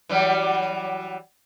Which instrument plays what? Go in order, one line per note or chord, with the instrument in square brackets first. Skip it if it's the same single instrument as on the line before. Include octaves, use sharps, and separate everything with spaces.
[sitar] E3 F#3 G3